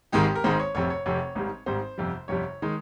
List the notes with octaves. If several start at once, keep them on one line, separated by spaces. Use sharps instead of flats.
G#1 G#2 D#3 G#3 G4
A#4
G#1 G#2 D#3 G#3 C5
C#5
F1 F2 C3 C#5
C#5
F1 F2 C3 C#5
G#1 G#2 G3
G#1 G#2 G3 C5
G1 F2 C3 G3
G1 F2 C3 G3 C#5
D#3 G#3